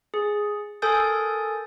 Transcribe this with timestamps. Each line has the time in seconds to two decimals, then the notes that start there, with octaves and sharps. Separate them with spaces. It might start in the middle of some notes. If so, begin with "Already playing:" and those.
0.14 G#4
0.82 A4 A#4 G#5 D#6 G6 A6